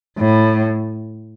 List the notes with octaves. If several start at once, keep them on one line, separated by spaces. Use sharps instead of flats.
A2